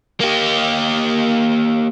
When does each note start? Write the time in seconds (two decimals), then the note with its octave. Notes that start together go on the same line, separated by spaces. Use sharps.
0.20 A#3 G4